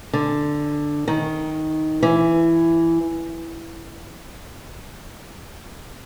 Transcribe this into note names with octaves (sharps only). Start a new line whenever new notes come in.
D3
D#3
E3